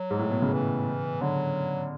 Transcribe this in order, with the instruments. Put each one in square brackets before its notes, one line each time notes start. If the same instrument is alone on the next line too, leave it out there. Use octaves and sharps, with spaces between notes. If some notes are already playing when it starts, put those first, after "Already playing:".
Already playing: [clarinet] F#3
[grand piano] G#2
A2
B2
C#3
[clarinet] E3
[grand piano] D3 [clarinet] F#3